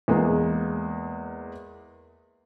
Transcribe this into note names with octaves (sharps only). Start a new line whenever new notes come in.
E2 G#3 A#3